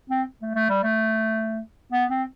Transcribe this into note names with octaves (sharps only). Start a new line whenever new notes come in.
C4
A3
A3
G3
A3
B3
C4